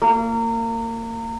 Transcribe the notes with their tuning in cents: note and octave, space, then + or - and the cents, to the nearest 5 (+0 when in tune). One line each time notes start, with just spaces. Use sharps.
A#3 -30